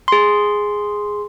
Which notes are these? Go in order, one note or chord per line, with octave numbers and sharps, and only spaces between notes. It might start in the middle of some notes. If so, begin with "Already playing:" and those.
G#4 C6